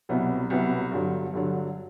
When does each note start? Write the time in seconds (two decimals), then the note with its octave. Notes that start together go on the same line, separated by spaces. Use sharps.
0.09 C2 B2 F#3 B3 E4
0.50 C2 B2 F#3 B3 E4
0.92 G2 D3 F#3
1.34 G2 D3 F#3